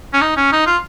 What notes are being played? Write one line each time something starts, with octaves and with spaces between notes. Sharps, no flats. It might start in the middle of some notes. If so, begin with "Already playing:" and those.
C#4
D#4
C#4
D#4
F4